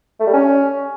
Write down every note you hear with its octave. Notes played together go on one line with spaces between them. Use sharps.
A3
G3
C#4